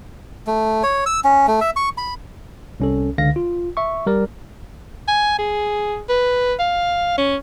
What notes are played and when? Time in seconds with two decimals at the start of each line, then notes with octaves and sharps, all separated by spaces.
0.47 A3
0.83 C#5
1.06 E6
1.24 C#4
1.48 A3
1.61 E5
1.76 C#6
1.98 B5
2.80 C2 C#4 A4
3.18 C#2 D3 F5 A#6
3.36 F4
3.77 E5 C#6
4.06 G3 A#4 D5
5.08 G#5
5.39 G#4
6.09 B4
6.59 F5
7.18 C#4